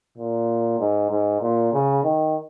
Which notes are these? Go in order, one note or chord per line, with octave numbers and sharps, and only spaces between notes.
A#2
G#2
G#2
A#2
C#3
D#3